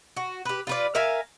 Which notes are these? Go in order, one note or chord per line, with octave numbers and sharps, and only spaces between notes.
F#4
G4 B4
F4 B4 D5
A#4 E5 F5 G#5